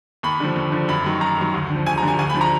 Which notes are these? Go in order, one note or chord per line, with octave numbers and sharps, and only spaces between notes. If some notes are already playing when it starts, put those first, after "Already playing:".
D#2 B5
D3 F3
D#2
D3 F3
F#2 B5
D#3 F#3
F#2 A#5
D#3 F#3
D2
D3 F3
D2 G#5
A#5
D3 F3
G#5
D2 G#5
B5
D3 F3
A#5